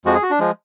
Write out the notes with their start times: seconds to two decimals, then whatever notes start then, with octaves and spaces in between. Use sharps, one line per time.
0.05 F2 F3 G#3 F#4
0.14 G#4
0.22 F#4
0.31 D4
0.40 F3 G#3